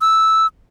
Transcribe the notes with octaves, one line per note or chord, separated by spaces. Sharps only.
E6